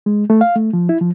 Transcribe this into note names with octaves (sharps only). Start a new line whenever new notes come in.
G#3
A3
F5
A3
F3
E4
F3